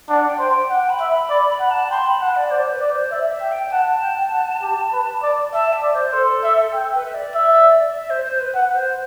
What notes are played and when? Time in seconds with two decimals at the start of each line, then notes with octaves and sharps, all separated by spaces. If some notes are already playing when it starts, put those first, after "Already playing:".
0.09 D4 F#5
0.29 G5
0.39 C5
0.50 G5
0.69 F#5 G5
0.90 B5
1.00 E5
1.10 B5
1.30 D5 B5
1.50 B5
1.60 F#5
1.70 A5
1.90 G5 C6
2.06 B5
2.21 F#5 A5
2.35 D5
2.51 C5 D5
2.71 B4
2.81 D5
2.91 C5
3.11 D5 E5
3.31 E5
3.41 G5
3.52 G5
3.72 F#5 A5
4.02 G5
4.32 F#5
4.62 G4
4.93 B4
5.23 D5
5.53 E5 A5
5.73 E5
5.83 D5
5.93 C5
6.13 A4 C5
6.44 E5
6.74 A4 G5
6.94 B4
7.05 E5
7.14 D5
7.34 E5
7.95 E5
8.10 C5
8.25 C5
8.40 B4
8.55 B4 F#5
8.75 C5